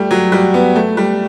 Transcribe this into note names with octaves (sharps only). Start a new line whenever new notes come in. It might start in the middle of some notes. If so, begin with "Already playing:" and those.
Already playing: G3 A3
F#3
G3
B3
A3
G3